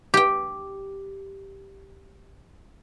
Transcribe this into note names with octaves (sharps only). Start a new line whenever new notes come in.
G4 G5